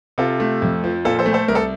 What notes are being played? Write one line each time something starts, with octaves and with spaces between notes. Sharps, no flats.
C3 F4 A4
A3
F2
F3
A#2 F4 A4
A4 C5
A3
A4 C5
C2 A#4
A4